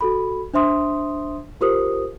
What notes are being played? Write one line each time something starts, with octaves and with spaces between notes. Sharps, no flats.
F#4 A4 B5
D4 C5 E5 C6 D#6
F4 G4 A#4 C5 D#6